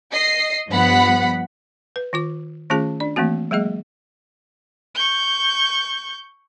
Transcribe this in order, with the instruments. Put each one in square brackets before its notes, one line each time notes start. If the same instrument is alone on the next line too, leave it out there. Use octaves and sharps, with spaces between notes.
[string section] D#5 C7
G2 F3 B3 F#5 B5
[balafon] B4
D#3 F4 D6
D#3 A3 C#4 F4 G#4 A5
D4 D5
E3 A3 A#3 C4 F#4
F#3 G#3 A#3 G#4 D#5
[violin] C#6 G6